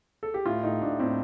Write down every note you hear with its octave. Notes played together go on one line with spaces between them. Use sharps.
A4
G4
A2 F4
A2 D#4
A2 D4
A2 C4